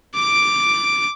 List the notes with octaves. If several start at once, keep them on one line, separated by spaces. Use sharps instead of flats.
D6 D7